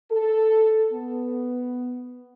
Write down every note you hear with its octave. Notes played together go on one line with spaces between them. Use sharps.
A4
B3